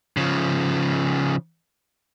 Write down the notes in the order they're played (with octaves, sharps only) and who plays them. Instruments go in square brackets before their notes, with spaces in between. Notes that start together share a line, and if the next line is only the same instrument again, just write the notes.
[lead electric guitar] C#3 F3